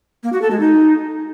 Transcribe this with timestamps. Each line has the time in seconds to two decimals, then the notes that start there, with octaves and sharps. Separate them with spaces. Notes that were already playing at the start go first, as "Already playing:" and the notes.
0.23 A#3
0.33 F#4
0.42 A4
0.51 G#3
0.60 D#4